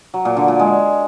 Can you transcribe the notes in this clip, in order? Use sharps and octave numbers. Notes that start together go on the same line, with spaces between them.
F#3
A#2
D3
A#2
G#3